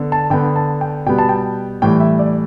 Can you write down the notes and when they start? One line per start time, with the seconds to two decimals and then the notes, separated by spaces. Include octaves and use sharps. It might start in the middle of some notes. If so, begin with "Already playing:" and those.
Already playing: D3 B3
0.12 A5
0.30 D3 B3 G5
0.56 A5
0.81 G5
1.06 B2 G3 B3 G5
1.18 A5
1.29 G5
1.82 A2 E3 G3 G5
2.00 E5
2.19 D5